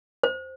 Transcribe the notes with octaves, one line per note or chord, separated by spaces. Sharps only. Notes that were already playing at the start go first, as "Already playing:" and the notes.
C5